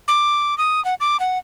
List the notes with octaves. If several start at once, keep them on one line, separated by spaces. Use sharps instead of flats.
D6
D#6
F#5
D6
F#5